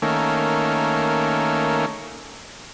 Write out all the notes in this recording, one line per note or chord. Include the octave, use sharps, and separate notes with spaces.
D#3 A3 A#3 C#4